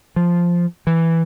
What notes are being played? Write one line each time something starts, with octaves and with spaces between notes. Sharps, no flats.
F3
E3